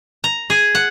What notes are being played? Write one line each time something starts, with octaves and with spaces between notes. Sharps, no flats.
A#5
G#4
F#5